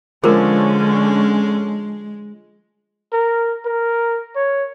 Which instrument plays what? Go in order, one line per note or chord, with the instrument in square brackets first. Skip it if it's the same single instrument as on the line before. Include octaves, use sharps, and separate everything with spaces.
[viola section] D3 C#4 [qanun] F3 [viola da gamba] G#3 [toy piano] G#4 A#4
[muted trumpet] A#4
A#4
C#5